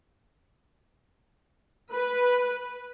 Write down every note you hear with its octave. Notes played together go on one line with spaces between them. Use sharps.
B4